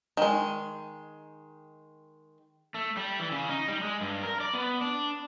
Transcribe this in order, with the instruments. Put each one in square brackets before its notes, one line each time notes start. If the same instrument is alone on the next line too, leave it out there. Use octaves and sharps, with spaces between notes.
[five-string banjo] D#3 G#3
[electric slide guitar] A3
G3
E3
C#3
D#4
G3
G#3
G2
A#4
D5
B3
D4